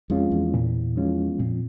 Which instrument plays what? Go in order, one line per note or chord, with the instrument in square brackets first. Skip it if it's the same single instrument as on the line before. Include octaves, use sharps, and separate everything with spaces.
[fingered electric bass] F2 [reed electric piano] F3 G#3 C#4 F4
[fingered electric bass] E2
[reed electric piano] A#2
F3 G#3 C#4 F4
[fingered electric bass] F2 [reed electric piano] A#2